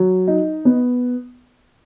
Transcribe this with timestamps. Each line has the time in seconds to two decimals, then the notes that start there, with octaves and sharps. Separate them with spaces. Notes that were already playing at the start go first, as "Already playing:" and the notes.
Already playing: F#3
0.28 D#4
0.65 B3